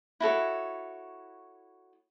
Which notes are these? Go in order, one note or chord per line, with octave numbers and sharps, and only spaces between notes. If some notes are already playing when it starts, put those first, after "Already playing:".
E4 F#4 A4 C#5